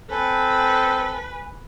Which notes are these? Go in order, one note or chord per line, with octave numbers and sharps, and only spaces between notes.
C4 A4 B4 G#5